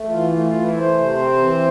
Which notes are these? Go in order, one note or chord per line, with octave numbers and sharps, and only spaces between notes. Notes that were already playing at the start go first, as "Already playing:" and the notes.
Already playing: A3
E3 F4
A3 F4
F4
E3
E4
A3
C5
C3
C4
E3